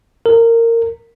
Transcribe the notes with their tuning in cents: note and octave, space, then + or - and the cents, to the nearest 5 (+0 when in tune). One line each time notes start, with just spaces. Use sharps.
A#4 -20